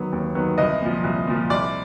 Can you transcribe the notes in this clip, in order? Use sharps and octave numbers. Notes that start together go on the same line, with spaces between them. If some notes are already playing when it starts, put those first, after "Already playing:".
Already playing: D#3 F#3 B3
D#2
D#3 F#3 B3
C2 D#5
A#2 F3
C2
A#2 F3
C2 D5